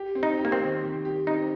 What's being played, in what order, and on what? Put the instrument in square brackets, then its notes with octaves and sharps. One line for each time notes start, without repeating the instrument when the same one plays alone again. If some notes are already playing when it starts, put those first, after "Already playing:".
Already playing: [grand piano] G4
C4
[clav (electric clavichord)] D#4
[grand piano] G4
[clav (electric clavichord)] A#3
C4
[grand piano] D#3
G4
G4
[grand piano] C4 [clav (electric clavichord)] D#4